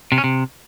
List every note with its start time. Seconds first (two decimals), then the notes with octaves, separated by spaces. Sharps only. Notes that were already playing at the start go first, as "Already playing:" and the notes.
0.12 C3
0.18 C#4
0.24 C3